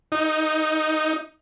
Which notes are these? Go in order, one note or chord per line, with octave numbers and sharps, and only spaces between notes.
D#4